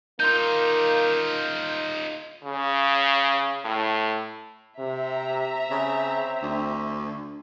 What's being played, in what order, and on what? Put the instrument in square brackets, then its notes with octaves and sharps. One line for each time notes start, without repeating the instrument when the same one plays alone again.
[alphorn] A#3 [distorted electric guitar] D#4 F4 [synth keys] C6 G6
[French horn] C#3
A2
[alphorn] C3 [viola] E5 A#5
[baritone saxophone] C#3 [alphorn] C4
[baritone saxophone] D2